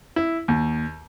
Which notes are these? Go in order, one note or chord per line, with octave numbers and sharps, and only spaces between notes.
E4
D#2